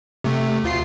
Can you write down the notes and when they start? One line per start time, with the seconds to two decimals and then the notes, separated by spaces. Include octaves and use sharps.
0.24 C3 A3
0.64 D2 F4 C7